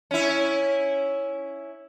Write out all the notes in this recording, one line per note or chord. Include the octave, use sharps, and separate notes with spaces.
C#4 E4